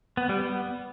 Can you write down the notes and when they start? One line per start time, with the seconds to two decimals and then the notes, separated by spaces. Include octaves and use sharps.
0.17 B3
0.29 G3
0.41 B3